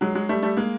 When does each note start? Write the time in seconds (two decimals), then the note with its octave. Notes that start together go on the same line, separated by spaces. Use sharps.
0.01 F#3 G#3
0.15 F#3 G#3
0.29 G3 A3
0.42 G3 A3
0.57 G#3 A#3